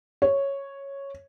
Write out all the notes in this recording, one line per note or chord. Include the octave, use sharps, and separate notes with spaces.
C#5